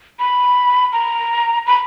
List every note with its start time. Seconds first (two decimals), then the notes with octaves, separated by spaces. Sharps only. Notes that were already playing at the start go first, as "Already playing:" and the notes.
0.19 B5
0.93 A#5
1.67 B5